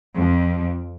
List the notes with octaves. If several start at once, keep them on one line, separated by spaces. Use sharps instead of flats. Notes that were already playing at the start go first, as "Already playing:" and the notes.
F2